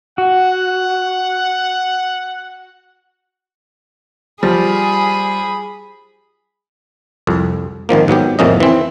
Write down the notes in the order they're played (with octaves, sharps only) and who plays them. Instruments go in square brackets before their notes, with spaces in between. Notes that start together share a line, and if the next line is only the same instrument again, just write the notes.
[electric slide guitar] F#4 [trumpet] F#5
[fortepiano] F3 [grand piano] G3 [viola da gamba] G#4 [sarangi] B5
[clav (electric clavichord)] C2 F2
G#1 D#3 F3 A#3
G#2 F#3 B3 G4
A1 F2 C3 A#3 C#4 D#5
E3 C4